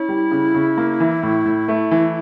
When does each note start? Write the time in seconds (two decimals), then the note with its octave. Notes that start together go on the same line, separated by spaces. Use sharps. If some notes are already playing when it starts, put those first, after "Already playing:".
Already playing: C#4 E4
0.09 G3
0.31 C#3
0.54 C#3
0.78 A#3
1.00 E3
1.23 A2
1.45 A2
1.68 A3
1.91 E3